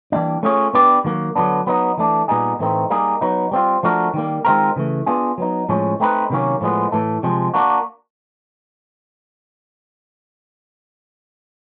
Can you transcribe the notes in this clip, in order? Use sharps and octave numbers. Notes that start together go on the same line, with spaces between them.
E3 G3 A#3 D4
A3 C#4 F4 G#4 C#5
B3 D4 G4 B4 D5
D#3 F#3 A#3
D3 F#3 B3 D4
F#3 B3 D#4
E3 A3 D4
A#2 G3 B3 D#4 G#4
A2 E3 A3 C4 D#4
G3 A#3 D#4 G#4
F#3 B3 D#4
G3 C4 F4
F3 A3 D4 F#4 A#4
D#3 G3 A#3
D#3 G#3 C4 F4 A#4
C#3 E3 A3
B3 D4 F4 G#4
F#3 B3 D#4
A2 F3 G#3 C#4
A3 C4 D#4 G4 B4
C3 D#3 F#3 A#3 C#4
A2 F3 G#3 B3
A2 E3 A3
C3 F3 G#3
A#3 D4 F#4